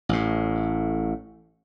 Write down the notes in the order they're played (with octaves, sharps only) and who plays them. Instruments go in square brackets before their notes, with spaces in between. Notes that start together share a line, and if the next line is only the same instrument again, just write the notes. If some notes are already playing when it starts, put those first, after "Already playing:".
[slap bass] A1 A2